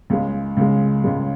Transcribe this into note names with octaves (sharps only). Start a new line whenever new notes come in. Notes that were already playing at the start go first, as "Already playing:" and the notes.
C#2 C#3 G#3
C#2 C#3 G#3
C#2 C#3 G#3